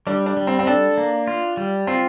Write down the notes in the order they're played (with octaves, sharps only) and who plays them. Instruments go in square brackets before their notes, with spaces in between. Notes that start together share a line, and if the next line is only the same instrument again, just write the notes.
[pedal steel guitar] G3 [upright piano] D4
[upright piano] D4
[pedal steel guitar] G3
[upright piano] C4
C4
[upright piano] D4 [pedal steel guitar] A4
[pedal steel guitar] A#3
F4
G3
[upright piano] C4 [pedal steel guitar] F4